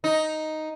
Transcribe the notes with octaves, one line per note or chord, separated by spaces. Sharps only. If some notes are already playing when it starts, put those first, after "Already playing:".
D#4